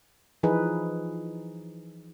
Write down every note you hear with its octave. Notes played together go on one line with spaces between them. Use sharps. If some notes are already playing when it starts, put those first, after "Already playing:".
E3 F3 D#4 G#4 B4